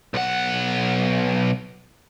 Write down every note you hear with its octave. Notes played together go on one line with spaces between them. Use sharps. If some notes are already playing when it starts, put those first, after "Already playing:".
B1 F#5